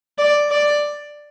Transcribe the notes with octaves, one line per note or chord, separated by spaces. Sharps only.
D5
D5